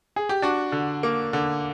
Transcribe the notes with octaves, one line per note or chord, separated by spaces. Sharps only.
G#4
G4
D4 F#4
D3
A#3
D3